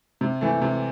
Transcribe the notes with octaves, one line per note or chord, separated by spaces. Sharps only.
C3
E3 A3
C3